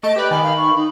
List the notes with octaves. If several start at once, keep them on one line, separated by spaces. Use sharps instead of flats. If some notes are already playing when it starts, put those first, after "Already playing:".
A3 D#5 A5 D7
G4 B4 D5
D#3 G#5 B5
F5
C#6
D#4